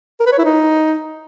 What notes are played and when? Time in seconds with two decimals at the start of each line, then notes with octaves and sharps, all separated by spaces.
0.20 A#4
0.26 B4
0.32 C#5
0.38 E4
0.45 D#4